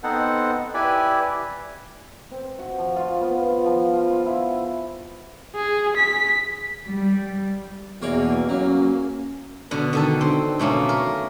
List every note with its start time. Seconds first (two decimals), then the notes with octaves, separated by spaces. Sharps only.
0.03 B3 C4 D#4 A4 C5 F#5
0.74 E4 G4 B4 D5 G#5 B5
2.32 C4
2.59 F#4
2.78 F3
2.96 F4
3.21 B3
3.43 F4
3.66 F3
3.93 F4
4.09 F4
4.26 E4
4.48 G#4
5.56 G#4
5.97 B6
6.89 G3
8.02 E2 B2 E3 A#3 C#5 D5
8.49 F#3 C#4
9.71 B2 D3 B3
9.93 D3 D#3 A4
10.21 C4
10.59 B2 A3 A#3 C#4
10.89 A#4